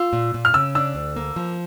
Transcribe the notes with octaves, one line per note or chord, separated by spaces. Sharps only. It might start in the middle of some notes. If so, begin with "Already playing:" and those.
Already playing: F4 E6
A#2
A#2
F6
C#3 E6
D4 E6
D2
A#3
F3